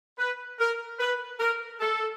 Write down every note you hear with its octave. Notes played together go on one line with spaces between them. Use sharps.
B4
A#4
B4
A#4
A4